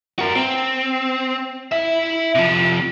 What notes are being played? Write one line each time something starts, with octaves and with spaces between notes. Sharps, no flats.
F#4 A#4
C4
E4 E5
C3 F3